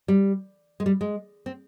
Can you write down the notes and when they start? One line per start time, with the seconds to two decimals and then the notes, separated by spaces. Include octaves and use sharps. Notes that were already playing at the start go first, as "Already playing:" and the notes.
0.08 G3
0.80 G#3
0.86 G3
1.01 G#3
1.46 C4